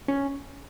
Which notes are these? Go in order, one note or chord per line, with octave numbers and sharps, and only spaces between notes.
C#4